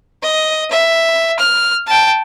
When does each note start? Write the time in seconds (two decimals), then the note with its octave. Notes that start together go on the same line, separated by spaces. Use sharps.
0.23 D#5
0.71 E5
1.39 F6
1.87 G5 A5